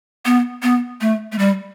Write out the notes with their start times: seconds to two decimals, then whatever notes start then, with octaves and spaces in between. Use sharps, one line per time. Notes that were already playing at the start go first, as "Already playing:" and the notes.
0.25 B3
0.62 B3
1.01 A3
1.32 A3
1.38 G3